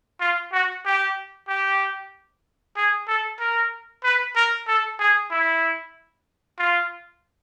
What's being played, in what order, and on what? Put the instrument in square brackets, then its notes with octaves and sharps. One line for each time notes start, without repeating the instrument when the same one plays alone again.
[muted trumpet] F4
F#4
G4
G4
G#4
A4
A#4
B4
A#4
A4
G#4
E4
F4